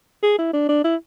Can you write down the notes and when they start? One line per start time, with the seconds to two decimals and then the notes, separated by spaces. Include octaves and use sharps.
0.23 G#4
0.39 E4
0.53 D4
0.69 D4
0.84 E4